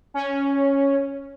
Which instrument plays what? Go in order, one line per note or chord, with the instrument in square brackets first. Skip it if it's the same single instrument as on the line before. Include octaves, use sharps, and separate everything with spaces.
[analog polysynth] C#4